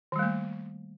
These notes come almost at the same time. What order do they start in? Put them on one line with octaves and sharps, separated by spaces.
D#3 G3 A3 A#3